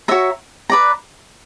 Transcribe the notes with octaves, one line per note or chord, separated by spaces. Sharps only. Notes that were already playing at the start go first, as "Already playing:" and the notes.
F#4 C#5 E5 A#5
B4 D5 A#5